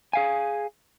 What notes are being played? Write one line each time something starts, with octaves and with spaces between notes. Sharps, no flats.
G#4 F5 G#5